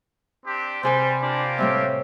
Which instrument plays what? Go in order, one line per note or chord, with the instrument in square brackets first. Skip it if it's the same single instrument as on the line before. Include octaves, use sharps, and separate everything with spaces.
[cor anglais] C4 [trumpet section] D4 G4
[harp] C3 G#4 B4 [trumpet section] G3 [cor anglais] C5
[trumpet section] A#3 F4 G4 [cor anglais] D4
[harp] A2 G3 C4 [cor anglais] E5